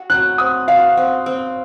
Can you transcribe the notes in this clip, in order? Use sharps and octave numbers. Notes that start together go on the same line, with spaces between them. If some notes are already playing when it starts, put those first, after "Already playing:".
Already playing: F#4
F#3 F#6
C4 D#6
F#4 F5
C4
C4